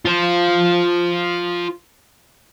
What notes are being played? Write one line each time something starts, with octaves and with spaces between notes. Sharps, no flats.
F4 C5